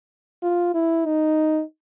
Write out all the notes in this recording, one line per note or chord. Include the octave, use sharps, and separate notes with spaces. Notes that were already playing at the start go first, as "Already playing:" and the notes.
F4
E4
D#4